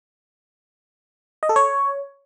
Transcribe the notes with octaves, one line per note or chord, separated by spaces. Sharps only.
D#5
A4
C#5